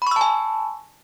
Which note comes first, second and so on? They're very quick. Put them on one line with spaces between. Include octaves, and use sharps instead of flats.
B5 C#6 E6 A5 G#5